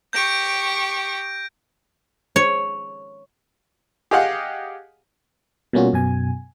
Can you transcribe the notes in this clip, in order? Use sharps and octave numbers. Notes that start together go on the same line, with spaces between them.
G4 C#6 G6 A#6 D7
C#5
G4 G#4 D#5 F5 F#5
B2 G3 A#3 C#4 F4 F#4
F#2 B2 G#5